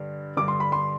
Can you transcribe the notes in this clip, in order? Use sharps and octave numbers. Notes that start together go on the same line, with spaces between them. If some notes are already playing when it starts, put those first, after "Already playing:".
Already playing: G2 D3
G2 D3 D6
C6
B5
C6